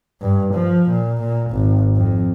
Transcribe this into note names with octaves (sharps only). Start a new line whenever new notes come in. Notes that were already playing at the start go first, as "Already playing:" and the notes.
G2
F3
A#2
A#2
G#1
F2